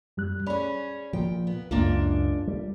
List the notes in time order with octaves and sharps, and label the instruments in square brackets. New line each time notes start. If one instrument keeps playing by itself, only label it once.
[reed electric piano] F#2 G3 F#6
[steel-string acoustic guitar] C#4 G#4 [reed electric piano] D5 B5
[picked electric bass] A#2 F3 [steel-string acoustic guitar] G5
[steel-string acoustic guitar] B3
[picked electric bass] C#2 F#2 [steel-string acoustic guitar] G#3 A#3 D4 [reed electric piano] F4
[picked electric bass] G3